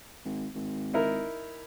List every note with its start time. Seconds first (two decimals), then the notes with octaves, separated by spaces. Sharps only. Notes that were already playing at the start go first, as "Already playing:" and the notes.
0.25 G#1
0.54 G#1
0.93 D#4 E4 A#4